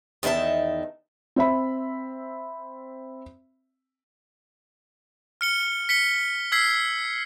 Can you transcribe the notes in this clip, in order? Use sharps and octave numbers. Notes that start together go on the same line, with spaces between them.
E2 D#3 D#4 E5 A5
C4 C5 E5 B5
F6 C#7 G7
B6 C#7 G7
E6 F6 G#6 B6 C7